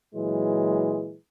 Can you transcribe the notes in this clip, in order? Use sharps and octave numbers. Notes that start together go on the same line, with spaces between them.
A#2 E3 F#3 G#3